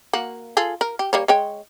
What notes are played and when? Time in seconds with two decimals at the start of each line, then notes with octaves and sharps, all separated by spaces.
0.13 A#3 F#4
0.57 F4 G#4 A4
0.81 A#4
0.99 G4
1.13 G3 A#3 C#5
1.28 G#3 C#5 G5